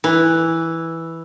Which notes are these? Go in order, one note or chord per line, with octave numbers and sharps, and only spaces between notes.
E3